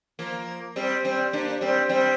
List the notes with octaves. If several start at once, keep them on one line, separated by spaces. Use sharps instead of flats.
F3 A#3
G3 C4
G3 C4
A#3 D4
G3 C4
G3 C4